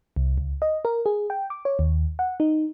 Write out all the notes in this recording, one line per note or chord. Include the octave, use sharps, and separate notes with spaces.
C2
C#2
D#5
A#4
G#4
G5
D6
C#5
D#2
F#5
D#4